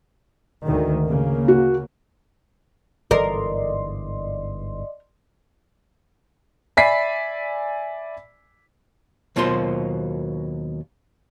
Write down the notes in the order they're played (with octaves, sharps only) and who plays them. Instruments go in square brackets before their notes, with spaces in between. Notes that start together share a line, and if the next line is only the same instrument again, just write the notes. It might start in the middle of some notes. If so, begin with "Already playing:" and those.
[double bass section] D2 G#2 D#3
C#3 A#3
[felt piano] F#4
[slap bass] G1 G#2 E3 [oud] A#4 [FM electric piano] D5 D#5 C6
[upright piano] D5 E5 G#5 B5 B6 C7
[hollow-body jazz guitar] D#2 B2 F#3 A#3 F4 C5